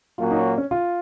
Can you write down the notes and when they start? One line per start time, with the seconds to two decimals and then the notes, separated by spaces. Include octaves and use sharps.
0.18 A#2 F#3 A#3 C#4 F4 F#4
0.31 D#4
0.58 C#4
0.71 F4